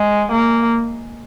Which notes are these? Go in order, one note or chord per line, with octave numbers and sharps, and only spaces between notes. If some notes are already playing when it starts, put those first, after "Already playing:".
Already playing: G#3
A#3